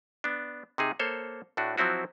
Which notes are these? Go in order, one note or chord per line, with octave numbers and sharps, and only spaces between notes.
B3 D4
C3 D#4 G#4
A#3 A4 C5 C#5
A2 A3 D4 F#4
F3 F#3 C4 E4 F#4